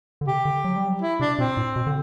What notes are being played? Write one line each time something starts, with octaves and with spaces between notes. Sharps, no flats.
D3
C3 G4
D3
F#3
G3
F#3
E4
C3 D4
B2 C4
A2
B2
D3